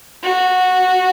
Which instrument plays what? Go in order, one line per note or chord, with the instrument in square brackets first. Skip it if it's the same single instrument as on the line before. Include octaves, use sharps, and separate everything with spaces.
[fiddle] F#4